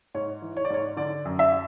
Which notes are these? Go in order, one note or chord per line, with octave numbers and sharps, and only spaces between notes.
G#2 C#5
E3
C#5
D5
G#2 C#5
D3 D5
F#2
E5